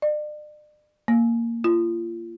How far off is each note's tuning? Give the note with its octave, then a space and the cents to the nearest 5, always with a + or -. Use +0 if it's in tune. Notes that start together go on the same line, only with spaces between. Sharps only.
D5 +40
A#3 -10
F4 -30